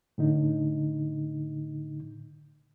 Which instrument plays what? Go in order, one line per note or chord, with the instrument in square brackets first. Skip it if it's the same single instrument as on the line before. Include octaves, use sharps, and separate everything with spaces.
[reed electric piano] A2 D3 D#4